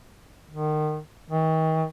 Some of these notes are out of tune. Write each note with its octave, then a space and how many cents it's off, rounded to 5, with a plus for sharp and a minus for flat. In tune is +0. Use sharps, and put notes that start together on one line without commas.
D#3 -30
D#3 +40